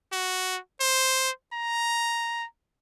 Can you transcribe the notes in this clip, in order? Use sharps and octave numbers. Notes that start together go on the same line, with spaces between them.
F#4
C5
A#5